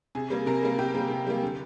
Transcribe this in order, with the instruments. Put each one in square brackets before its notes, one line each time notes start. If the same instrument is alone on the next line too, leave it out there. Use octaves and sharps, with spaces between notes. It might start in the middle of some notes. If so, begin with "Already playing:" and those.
[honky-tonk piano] C3 G#4
G3 A#3
C3 A#4
G3 A#3
C3 G4
G3 A#3
C3
G3 A#3
D3